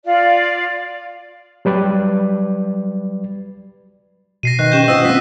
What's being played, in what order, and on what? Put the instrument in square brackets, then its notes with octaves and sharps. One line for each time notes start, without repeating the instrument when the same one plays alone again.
[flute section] F4 D5 F5
[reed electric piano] F#3 G3 B4 D5
[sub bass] B2 [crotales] A#6 C7 D#7
[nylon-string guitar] D#3 [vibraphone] B4 [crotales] F#6
[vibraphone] C#4 G4 G5 [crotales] G6
[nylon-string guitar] F4 C5 D#5 [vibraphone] F#5 D#6 [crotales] E6 A#6 E7
[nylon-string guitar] C4 F4 [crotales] B6